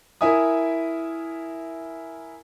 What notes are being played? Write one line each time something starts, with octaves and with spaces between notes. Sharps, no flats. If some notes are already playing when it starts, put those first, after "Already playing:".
E4 A#4 E5 G#5 D#6